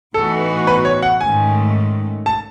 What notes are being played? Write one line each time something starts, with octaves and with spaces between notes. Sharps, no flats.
A2 E3 B3 D#4 F#4 A4
B4
C#5
F#5
G#2 D#3 A3 C#4 G#5
A5